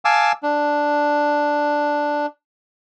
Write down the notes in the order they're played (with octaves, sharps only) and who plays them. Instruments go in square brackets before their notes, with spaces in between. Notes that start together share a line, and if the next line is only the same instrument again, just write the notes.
[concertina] F5 G#5 A5 D6 E6
D4